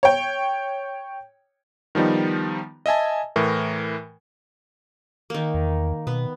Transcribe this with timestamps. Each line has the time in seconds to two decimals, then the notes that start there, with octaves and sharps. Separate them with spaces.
0.03 C#5 G5
1.95 D#3 F3 G3 B3 D#4
2.86 D#5 E5 G#5 A5
3.36 A2 E3 A#4
5.30 D#3 A#3
5.54 E2
6.07 B2 B3